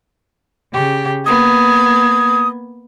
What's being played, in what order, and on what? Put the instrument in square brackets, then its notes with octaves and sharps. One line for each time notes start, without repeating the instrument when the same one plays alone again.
[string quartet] C#3 G4
[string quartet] A#3 B3 G#6 [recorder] D#6